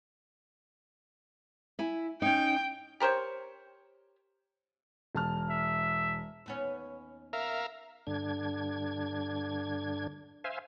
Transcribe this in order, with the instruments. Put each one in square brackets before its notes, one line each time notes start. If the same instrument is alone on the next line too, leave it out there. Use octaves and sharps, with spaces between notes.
[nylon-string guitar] E4 G#5
[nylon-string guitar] C#4 D#4 [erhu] G5
[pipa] G4 A#4 C5 C#5
[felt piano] E1 A5 F6
[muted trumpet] E5
[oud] D#2 B3 C#4
[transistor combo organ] A#4 E5 F5
[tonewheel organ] G2 D3 D4 G#6
C5 E5 F5 G#5